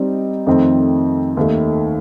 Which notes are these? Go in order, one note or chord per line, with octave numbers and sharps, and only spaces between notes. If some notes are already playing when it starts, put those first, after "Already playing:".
Already playing: G3 C4 D#4 D5
F2 D#3 A3 C4
D#2 D#3 A3